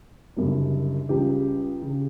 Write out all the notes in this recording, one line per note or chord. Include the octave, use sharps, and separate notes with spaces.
F#1 F#2 D3 G3
C#2 C#3 G3 G4
C#3